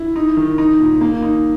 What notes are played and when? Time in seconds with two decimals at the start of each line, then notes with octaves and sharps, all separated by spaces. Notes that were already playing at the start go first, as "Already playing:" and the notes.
Already playing: E4
0.16 D#4
0.37 D#3
0.58 D#4
0.80 A#2
1.01 A#3
1.22 D#4